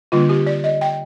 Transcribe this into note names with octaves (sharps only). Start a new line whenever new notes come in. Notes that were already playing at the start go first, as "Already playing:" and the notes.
D3 G3 A#3 D4 F4
G4
D5
D#5
G5